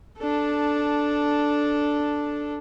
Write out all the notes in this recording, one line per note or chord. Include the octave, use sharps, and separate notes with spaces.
D4 A4